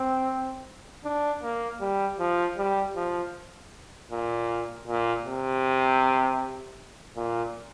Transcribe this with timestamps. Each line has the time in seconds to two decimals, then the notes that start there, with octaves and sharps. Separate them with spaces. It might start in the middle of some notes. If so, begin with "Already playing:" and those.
Already playing: C4
1.05 D4
1.43 A#3
1.81 G3
2.19 F3
2.57 G3
2.96 F3
4.11 A#2
4.87 A#2
5.25 C3
7.16 A#2